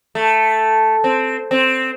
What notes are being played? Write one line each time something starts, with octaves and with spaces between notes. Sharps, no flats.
A3
C4
C4